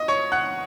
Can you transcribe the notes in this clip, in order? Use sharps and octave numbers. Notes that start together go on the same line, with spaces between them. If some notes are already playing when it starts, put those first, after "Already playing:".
Already playing: D#5 D#6
C#5 C#6
F#5 F#6